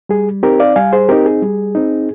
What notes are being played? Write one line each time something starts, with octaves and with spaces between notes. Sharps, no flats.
G3 G#4
C4 D#4 G4 A#4
D5 F5
G3 F5 G#5
G#4 C5
C4 D#4 G4 A#4
G#4
G3
C4 D#4